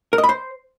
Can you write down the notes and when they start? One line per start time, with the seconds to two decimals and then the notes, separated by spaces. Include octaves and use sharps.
0.13 A#4
0.18 D#5
0.24 B5
0.29 C5